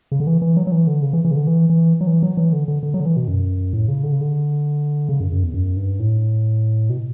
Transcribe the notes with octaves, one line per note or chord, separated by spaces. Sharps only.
C#3
D3
E3
E3
F#3
F#3
E3
D3
C#3
E3
E3
C#3
D3
E3
E3
F#3
E3
F#3
E3
D3
D3
D3
F#3
D3
E3
B2
F#2
A2
C#3
D3
C#3
D3
C#3
F#2
F#2
E2
F#2
G2
A2
B2